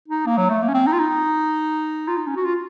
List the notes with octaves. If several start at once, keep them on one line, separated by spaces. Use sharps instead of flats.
D#4
A#3
F#3
A3
A#3
C#4
C4
D#4
F4
D#4
F4
D#4
C#4
F#4
F4